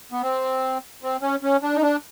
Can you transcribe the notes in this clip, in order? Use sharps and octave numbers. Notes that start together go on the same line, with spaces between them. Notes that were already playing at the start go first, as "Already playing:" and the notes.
B3
C4
C4
C#4
C#4
D4
D#4
D4